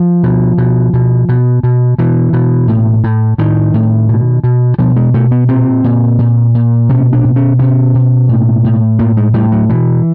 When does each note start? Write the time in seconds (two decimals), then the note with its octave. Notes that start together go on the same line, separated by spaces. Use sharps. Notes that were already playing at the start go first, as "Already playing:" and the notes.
Already playing: F3
0.23 B2
0.58 B2
0.93 B2
1.29 B2
1.63 B2
1.98 B2 E3
2.33 B2
2.68 A2
3.04 A2
3.38 A2 D#3
3.74 A2
4.09 B2
4.44 B2
4.79 B2 F3
4.96 G#3
5.14 B2 A3
5.31 B3
5.49 A#2 C4
5.84 A#2
6.19 A#2
6.55 A#2
6.89 B2 C#4
7.13 D4
7.25 B2
7.36 C#4
7.59 B2 C#4
7.95 B2
8.29 A2
8.65 A2
8.99 A2 A#3
9.17 G#3
9.34 A2 G3
9.52 F#3
9.69 B2 E3